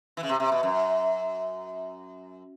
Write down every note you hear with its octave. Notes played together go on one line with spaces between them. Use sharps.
E3
C#3
C3
C3
B2
F#2